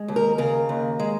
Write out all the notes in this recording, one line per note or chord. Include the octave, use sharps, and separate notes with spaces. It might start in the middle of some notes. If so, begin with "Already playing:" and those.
Already playing: G#3
D#2
A#4
C#3 A#4
D#2
G#3